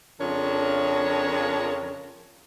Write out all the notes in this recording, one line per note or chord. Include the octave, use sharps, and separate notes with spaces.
F2 C#3 F3 D4 A#4 C#5